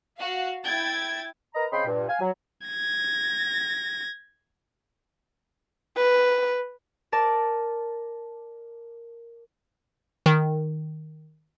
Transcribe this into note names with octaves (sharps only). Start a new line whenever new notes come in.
F#4 F5
E4 G5 G#6 A6
A#4 B4 D#5 A#5
C#3 C4 D#5 G5 B5 C6
G2 A#2
F5 G#5
F#3
G#6 A#6
B4
A#4 D5 A5
D#3